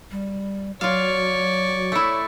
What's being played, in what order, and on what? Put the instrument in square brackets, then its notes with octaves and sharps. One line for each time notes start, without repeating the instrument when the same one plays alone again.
[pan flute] G3
[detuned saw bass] F#3 [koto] F4 F5 [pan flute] C#5 [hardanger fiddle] D5 C#6
[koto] A3 E4